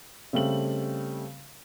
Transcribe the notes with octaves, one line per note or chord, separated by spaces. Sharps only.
C#3 G3 A3 C4 F#7